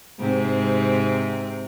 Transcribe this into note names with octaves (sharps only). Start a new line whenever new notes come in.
G#2 C3 C4